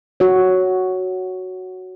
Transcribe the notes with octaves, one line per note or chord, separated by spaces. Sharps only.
F#4 C#5